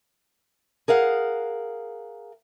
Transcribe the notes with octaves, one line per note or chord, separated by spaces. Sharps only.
G#4 A#4 F5 F#5